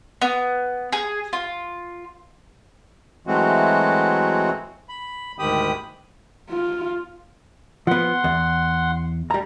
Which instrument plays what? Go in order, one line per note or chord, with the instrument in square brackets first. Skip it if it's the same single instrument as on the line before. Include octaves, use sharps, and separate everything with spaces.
[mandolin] B3
G#4
F4
[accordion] E3 F#3 G#3 A3 C4 F#4
B5
D2 G#2 D#3 G4 B5 D#6
[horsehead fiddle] F4
[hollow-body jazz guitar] F3 B3 [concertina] F#5 C6
[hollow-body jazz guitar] E2
G3 A#5